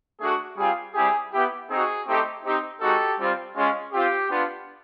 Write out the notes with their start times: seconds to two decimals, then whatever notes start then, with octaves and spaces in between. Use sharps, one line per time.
0.20 A3 D4 F#4 G#4
0.56 G3 C4 F4 G#4
0.94 G3 C4 E4 G4 G#4
1.32 B3 E4 G4
1.69 C4 D#4 F#4 G#4
2.06 A3 C4 D#4 G4
2.44 C4 D#4 G4
2.80 G#3 C4 D#4 F#4 G4 A4
3.17 G3 C4 F4
3.55 G#3 C#4 F4
3.93 C4 F4 G4
4.30 B3 D4 F4